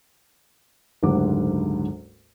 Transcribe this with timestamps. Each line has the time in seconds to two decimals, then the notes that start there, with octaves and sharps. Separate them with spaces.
1.03 F#1 D2 G#2 G4 F#5 D6